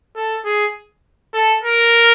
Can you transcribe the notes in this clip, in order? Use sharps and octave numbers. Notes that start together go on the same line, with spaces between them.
A4
G#4
A4
A#4